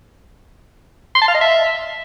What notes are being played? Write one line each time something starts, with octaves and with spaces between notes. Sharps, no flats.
C6
A5
F5
D#5
E5